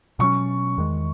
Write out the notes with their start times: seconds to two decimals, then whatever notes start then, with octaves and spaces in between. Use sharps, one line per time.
0.19 B2 F#3 C#4 C#6
0.78 E2 D#3 G#3